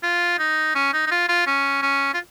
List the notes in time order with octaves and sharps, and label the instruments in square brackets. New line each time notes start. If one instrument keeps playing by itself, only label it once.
[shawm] F4
D#4
C#4
D#4
D#4
F4
F4
C#4
C#4
F4